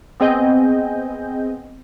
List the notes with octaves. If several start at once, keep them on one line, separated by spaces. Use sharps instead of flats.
B3 C4 G#4 D#5 G#5 G6